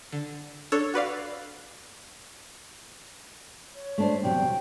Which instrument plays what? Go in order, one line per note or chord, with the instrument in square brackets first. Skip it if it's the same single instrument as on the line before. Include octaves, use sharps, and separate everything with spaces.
[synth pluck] D3
D4 A4 C#5
F#4 B4 D5 F5
[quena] C#5
[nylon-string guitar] A3 D4 C5
[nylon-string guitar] E2 C3 F#3 [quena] G5